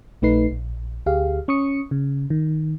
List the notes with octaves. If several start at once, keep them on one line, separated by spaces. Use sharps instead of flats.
A#1 A3 D#4 B4 C7
A#1
D2 G4 G#4 F5
C#4 C#6 D#6 C#7
C#3
D#3